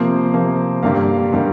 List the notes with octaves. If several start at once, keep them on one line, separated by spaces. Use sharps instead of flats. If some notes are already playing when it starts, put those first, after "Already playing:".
Already playing: C3 F3 A#3 C5
C3 F3 A#3
G2 D3 G3 A#3 F5
D3 G3 A#3